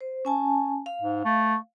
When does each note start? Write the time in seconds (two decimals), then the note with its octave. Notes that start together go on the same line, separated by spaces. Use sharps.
0.01 C5
0.25 C#4 G#5 A5
0.86 F5
1.02 G#2
1.25 A3